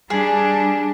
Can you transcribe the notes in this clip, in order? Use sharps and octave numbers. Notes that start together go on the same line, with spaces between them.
G3 D4 G#4